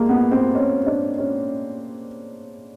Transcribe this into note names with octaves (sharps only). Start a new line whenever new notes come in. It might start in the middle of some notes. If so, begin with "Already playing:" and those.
Already playing: G#3 A#3
B3
C4
C#4
D4
C#4